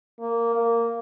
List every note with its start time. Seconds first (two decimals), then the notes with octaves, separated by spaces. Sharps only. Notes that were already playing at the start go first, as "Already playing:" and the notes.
0.20 A#3
0.55 A#3